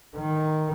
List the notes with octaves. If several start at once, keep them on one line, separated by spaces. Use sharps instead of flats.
D#3